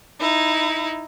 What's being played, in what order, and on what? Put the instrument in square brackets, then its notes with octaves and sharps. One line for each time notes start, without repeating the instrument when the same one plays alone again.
[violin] D#4 E4